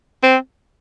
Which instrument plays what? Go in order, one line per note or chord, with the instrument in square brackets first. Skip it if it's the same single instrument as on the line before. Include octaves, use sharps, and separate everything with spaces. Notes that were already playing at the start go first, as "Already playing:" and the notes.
[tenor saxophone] C4